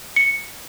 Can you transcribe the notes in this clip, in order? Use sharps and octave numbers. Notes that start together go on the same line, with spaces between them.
C#7